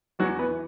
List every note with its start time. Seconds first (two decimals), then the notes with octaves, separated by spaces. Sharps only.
0.19 E2 F#3 F#4
0.39 B3 B4
0.49 E3